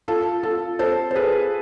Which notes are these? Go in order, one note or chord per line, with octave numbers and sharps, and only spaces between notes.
F4 A4
F4 A4
A4 C5
C5
G#4 B4